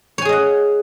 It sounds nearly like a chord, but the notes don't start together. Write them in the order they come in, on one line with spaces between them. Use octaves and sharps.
C#5 G#5 G#4 D#5 F#5